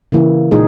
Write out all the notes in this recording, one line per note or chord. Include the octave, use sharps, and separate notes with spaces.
C#3 E3 A#3 E4
A#2 G#3 D#4 G#4